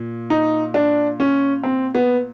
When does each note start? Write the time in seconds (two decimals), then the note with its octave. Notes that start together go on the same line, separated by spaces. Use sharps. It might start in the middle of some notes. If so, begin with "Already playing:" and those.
Already playing: A#2
0.30 D#4
0.74 D4
1.20 C#4
1.64 C4
1.95 B3